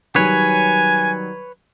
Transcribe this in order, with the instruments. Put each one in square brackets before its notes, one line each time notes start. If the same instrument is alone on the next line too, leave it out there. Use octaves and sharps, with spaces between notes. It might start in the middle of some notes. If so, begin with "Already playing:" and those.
[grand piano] D#3 F#3 G3 [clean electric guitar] B4 C#5 [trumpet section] G#5